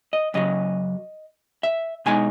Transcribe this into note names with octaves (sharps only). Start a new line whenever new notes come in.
D#5
F#2 C#3 F#3 D#5
E5
B2 G#3 D#4 G#5